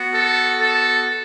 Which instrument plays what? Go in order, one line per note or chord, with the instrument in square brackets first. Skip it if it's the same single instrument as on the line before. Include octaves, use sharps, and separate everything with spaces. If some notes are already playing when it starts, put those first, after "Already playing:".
Already playing: [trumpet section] B3 F#4
A4
A4